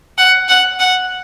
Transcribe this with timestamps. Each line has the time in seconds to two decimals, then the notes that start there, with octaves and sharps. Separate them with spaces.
0.18 F#5
0.49 F#5
0.80 F#5